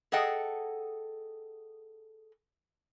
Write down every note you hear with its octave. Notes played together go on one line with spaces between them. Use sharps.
G#4 A4 D#5 F#5 G5